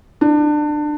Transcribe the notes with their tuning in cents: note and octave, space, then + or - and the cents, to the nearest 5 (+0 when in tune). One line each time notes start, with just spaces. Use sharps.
D4 +25